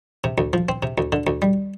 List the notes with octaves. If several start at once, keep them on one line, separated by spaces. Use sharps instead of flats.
C3
D2
F3
C4
C3
D2
D3
D2
G3